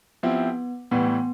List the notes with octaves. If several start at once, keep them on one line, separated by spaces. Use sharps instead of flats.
F3 B3 C4 E4 G4
A2 E3 G3 B3
B3